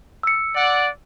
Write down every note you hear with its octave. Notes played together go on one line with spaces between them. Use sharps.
E6 C#7
D5 F#5